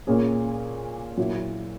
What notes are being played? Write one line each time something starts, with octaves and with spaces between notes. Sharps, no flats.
A#2 A#3 C#4 G#4
A#2 F#3 A#3 E4